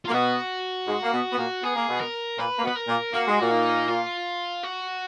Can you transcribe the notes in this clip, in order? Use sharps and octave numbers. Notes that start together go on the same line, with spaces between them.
F4
A#3
B2 B3 F#4
G#2 G#3
A#3
B2 B3
B3
A#2 A#3
B3 G#4
A#3
B2 B3
A#4
A#2 A#3 B4
A#3
B2 B3
B4
A#4
A#2 A#3
A#3 F#4
G#3
A#2 A#3
D#4
F4
F#4